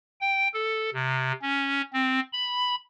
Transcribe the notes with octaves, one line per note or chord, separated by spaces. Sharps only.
G5
A4
C3
C#4
C4
B5